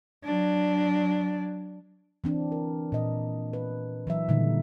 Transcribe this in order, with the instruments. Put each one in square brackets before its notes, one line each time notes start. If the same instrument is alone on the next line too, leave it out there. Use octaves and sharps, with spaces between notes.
[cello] F#3 D4
[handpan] E3 C4 D4
A#4
A#2 D#5
B4
E3 F#3 E5
A#2 D3 D#3 G3 D#4